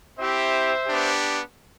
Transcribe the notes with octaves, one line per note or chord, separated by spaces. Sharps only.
C4 E4 G4 C5 E5
B3 D4 G4